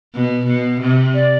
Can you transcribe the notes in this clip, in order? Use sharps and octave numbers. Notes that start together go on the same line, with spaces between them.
B2
B2
C3
D5